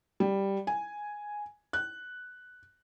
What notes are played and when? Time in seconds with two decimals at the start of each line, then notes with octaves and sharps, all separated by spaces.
0.20 G3
0.67 G#5
1.73 F#6